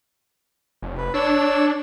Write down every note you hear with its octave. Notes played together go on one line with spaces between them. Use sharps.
F1
B4
D4 C#5 E6